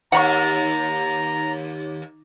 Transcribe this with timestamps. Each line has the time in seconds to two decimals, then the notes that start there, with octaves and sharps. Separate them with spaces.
0.12 D#2 F#5 A#5 B5 C#6